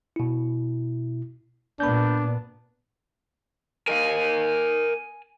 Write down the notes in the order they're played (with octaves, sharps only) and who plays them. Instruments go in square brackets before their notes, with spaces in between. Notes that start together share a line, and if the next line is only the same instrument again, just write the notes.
[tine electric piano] B2 E4
[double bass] A#2 B3 [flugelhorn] D4 [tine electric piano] B5 G6
[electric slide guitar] A#4 D#5 F5 [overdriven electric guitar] G#5